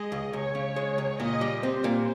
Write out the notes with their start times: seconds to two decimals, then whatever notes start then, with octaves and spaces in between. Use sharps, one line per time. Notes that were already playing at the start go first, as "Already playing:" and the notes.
Already playing: G#3 D#5
0.12 C#2
0.33 C#2 C#5
0.55 C#3
0.76 G#3
0.98 C#2
1.20 A#2 D#5
1.41 G3
1.62 C4 C5
1.84 A#2